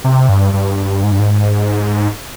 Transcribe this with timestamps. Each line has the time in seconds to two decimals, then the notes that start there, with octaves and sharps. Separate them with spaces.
0.04 C3
0.29 G2
0.53 G2
1.04 G#2
1.12 G2
1.19 G#2